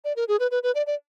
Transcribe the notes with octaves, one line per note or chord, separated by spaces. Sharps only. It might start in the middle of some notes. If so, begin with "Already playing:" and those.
D5
A#4
G#4
B4
B4
B4
D5
D5